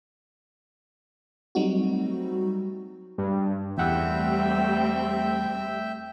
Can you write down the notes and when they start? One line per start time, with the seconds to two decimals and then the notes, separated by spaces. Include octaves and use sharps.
1.55 F#3 G3 A3 C4 D#4 F#4
3.18 G2
3.78 E2 G3 A3 C4 E5 F#5 G5 E6